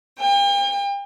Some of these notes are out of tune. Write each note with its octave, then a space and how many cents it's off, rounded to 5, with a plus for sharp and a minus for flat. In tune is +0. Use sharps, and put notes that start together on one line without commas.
G5 +40